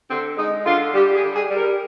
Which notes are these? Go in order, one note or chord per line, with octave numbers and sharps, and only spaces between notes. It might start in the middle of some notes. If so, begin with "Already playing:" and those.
D3 C4
G#3 D#4
D3 F4
G3 G4
G#4
D3
G#4
G3
A#4